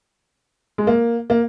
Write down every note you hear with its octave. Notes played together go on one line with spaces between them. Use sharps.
G#3
A#3
A#3